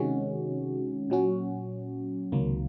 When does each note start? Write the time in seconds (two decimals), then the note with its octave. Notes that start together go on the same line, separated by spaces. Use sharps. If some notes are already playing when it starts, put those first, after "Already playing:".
Already playing: C3 D#3 G#3 C#4 F#4
1.10 A#2 F#3 C#4 F#4
2.32 C#2 C3 D#3 F#3 A#3